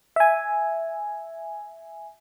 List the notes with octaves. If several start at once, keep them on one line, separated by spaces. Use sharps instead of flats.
E5 G#5